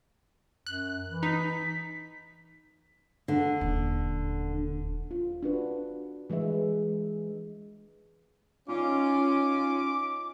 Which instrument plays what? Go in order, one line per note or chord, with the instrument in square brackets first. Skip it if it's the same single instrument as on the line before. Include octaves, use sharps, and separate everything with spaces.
[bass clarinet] F#2 [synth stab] F#6
[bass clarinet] E3
[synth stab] D#4 [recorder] B6
[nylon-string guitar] D3
[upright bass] D#1
[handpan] F4
D4 F#4 B4
E3 G#3 G#4 B4 E5
[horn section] C#4 F4 [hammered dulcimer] D#4 G#5 [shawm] D6